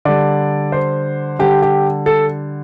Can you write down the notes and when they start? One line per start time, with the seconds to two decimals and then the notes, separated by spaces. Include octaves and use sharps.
0.05 D3 G3 D5
0.72 C5
1.39 D3 G3 G4
1.63 G4
2.06 A4